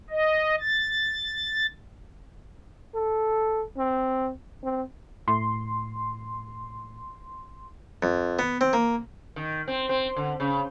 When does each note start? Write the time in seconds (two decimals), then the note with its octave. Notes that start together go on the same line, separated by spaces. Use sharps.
0.10 D#5
0.60 A6
2.95 A4
3.77 C4
4.63 C4
5.28 A2 C6
8.03 F2
8.39 B3
8.61 C4
8.73 A#3
9.36 D#3
9.68 C4
9.89 C4
10.16 D3
10.40 C#3